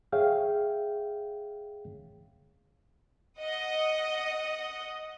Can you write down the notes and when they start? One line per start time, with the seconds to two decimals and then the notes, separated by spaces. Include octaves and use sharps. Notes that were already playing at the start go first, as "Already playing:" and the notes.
0.12 G#4 C#5 E5 F5 G5
3.40 D#5 F#5 D#6